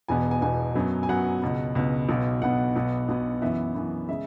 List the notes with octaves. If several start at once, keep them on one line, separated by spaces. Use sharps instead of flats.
E1 E2 B2 B3 G#5
G#5
E1 E2 B2 B3 G#5
F#2 F#3 B3
G#5
F#2 F#3 B3 F#5
C#2 B2 B3
C#2 B2 B3
B1 B2 B3
B1 B2 B3 F#5
B1 B2 B3
B1 B2 B3
F#2 E3 B3 E5
F#2 E3 B3
C#3 G#3 E5